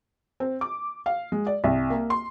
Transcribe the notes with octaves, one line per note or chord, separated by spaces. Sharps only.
C4
D6
F5
G#3
D5
C2
A#3
C6